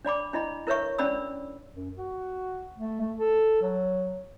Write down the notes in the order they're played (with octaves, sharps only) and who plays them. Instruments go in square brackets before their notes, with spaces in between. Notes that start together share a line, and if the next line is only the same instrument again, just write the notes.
[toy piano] D4 D5 B5 D6
D4 E4 D#5 B5
E4 A#4 B4 C#5 E5 C#6
C#4 D4 D5 B5 E6
[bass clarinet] F#2
F#4
A3
A3
A4
F#3